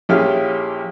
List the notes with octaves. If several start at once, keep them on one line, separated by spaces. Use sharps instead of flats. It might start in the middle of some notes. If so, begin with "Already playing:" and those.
A#1 C#4 E4 G4 G#4 F6